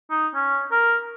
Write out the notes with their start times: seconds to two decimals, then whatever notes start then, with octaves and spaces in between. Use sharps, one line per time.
0.11 D#4
0.35 C#4
0.71 A#4